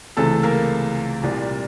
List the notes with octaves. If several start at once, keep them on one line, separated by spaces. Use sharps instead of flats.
C#2 C3 E3 G#3 A3 A4
A#3 A#4
C2 A#2 G3